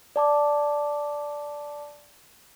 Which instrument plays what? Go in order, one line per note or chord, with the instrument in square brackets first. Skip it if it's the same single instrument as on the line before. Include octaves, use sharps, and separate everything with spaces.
[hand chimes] D5 A5 D6